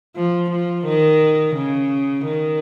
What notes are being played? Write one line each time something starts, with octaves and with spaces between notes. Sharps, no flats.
F3
F3
D#3
C#3
D#3